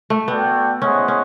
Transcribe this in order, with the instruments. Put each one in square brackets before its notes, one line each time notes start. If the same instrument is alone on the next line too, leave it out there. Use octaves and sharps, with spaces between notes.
[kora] A3
[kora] B3 [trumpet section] F#4 A4 D5 G5
[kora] C#4 [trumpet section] E4 G#4 C5 D#5 F#5
[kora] C#4